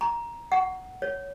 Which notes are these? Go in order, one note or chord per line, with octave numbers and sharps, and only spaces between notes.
A#5
F#5
C#5